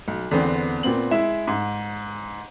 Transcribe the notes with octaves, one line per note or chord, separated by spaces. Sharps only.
B1
E2 D3 B3 C4 D4
A#2 B3 C4 F#7
G#3 E4 E5 E7
G#2